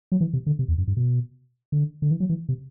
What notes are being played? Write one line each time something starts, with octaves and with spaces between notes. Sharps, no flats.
F#3
E3
C3
D3
C3
E2
F#2
G2
B2
D3
D3
E3
F#3
E3
C3